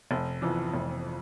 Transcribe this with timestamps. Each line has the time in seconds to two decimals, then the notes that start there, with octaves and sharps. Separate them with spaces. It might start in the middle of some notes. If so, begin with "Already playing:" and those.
0.11 F1
0.42 F2 E3
0.74 F1